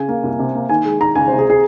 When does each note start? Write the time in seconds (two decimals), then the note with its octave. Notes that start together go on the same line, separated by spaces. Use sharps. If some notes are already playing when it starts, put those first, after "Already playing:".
Already playing: C#3 G#5
0.08 A#3
0.23 C2
0.39 C3
0.55 A#3
0.69 D#3 G#5
0.85 G#3
1.00 D#3 A#5
1.15 C#2 G#5
1.28 C5
1.32 C3
1.39 G#4
1.50 G#4